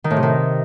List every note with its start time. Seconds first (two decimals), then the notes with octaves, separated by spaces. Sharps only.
0.04 D#3
0.10 A2
0.17 C3
0.23 D#3